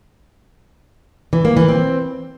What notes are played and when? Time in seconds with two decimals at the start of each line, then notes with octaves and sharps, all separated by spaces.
1.33 E3
1.45 A#3
1.57 E3
1.68 C4